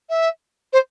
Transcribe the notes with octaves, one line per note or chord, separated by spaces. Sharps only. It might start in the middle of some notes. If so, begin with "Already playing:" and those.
E5
C5